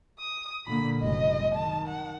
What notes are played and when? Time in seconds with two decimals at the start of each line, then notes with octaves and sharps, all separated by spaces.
0.19 D#6
0.66 A#2 D3 A#3 B5
1.00 F#1 C2 G#3 D#5
1.55 D#3 A5
1.88 F#5